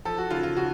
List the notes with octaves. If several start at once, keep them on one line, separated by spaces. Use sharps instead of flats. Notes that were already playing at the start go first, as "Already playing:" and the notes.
F3 A4
F#4
C#3 F4
F4
C#3 F#4